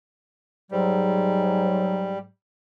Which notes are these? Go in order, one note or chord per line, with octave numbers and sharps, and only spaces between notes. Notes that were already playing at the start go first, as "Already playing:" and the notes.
G#2 F#3 G3